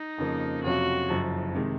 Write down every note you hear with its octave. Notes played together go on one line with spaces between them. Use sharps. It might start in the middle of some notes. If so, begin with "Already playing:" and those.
Already playing: D#4
F2 C#3 F3 A#3
F2 C3 F#3 C#4 F4 F#4
F#1 F#2 F3
C3 D#3 G#3 D#4